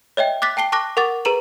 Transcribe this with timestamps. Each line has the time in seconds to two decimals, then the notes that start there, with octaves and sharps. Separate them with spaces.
0.17 C#5 D#5 E5 G5
0.42 D6 F#6 A6 B6
0.57 G5 A5 C7 G7
0.72 A5 C#6 D6 F#6 A#6
0.97 A#4 F#5 C#6 D6 A6
1.25 G#4 B4 A#5 E7 F#7